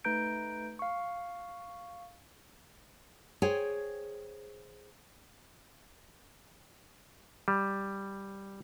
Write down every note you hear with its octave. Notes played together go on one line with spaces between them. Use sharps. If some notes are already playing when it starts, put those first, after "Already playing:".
A3 D#4 B4 A#5 G6 D7
F5 C#6
G#4 C5 C#5 G5 G#5
G3